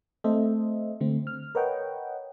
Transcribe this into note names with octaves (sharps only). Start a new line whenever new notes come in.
A3 C4 A4 C5 D#5 E5
D3 A3 C4
F6
A#4 B4 C#5 D#5 F#5 G5